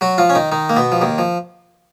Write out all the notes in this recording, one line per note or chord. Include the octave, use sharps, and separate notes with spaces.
F#3 F#4
F3 F4
C#4
D#3 D#4
D#3 D#4
A#3
B2 B3
F3
D#2 D#3
F3